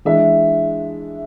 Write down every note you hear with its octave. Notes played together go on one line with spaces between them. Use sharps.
E3 G#3 D4 E5